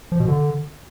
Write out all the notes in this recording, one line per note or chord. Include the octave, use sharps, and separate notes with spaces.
F3
B2
D3